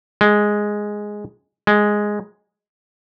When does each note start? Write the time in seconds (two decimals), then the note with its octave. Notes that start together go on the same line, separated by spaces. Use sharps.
0.21 G#3
1.67 G#3